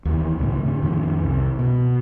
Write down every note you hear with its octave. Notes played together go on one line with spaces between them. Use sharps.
D#2 E3
C#2 A2
A2 D3
F2 D#3 F3
C2
B2